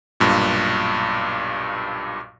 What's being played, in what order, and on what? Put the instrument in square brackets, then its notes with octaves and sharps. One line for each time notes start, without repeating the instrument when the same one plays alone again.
[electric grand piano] B1 G2 A#2